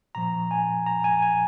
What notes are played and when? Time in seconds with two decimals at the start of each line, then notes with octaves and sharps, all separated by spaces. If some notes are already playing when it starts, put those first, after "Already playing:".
0.15 A#2 F3 A#5
0.51 G#5
0.86 A#5
1.04 G#5
1.22 G#5